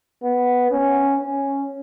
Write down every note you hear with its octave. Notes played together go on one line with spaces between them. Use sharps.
B3
C#4
C#4